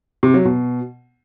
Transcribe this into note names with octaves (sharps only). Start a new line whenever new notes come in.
C3
F#3
B2